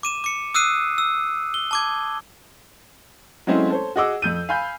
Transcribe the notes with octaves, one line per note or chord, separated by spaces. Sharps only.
D6 D#7 E7
D6 C#7
D#6 E6 F#6 C7 D#7
E6
G7
A5 D6 G#6
F#3 G#3 A3 C4 C#4 E4
A4 C5 C#5
F#4 G#4 D#5 F#5 D6 E6
F2 G6 D#7
F5 G#5 B5 G6